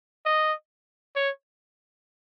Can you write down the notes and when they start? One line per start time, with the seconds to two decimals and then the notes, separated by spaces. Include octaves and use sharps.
0.26 D#5
1.16 C#5